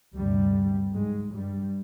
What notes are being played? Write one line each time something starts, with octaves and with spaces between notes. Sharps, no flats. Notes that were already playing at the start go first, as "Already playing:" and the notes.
D2 G2 C3 G3
G#2 G#3
G2 G3